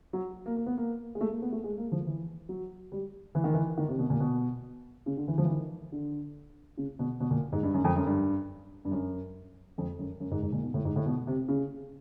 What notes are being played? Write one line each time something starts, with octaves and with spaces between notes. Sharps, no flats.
F#3
A#3
A#3
B3
A#3
G#3
A3
A#3
B3
A3
G#3
A#3
F3
E3
F#3
G3
E3
D#3
E3
D#3
C3
B2
A#2
B2
C#3
D3
E3
F3
E3
D#3
D3
C#3
B2
B2
A#2
G#2
G2
F#2
F2
F#2
G2
G2
F#2
F2
F#2
F#2
G#2
G#2
A#2
B2
A2
G#2
A2
B2
C3
C#3